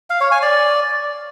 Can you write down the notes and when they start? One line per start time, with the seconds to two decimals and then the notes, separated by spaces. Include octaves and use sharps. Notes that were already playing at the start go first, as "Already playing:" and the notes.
0.10 F5
0.21 C#5
0.32 G#5
0.42 D5